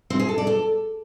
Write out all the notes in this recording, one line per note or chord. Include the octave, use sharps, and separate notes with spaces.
C4
G#4
A4
D5
A4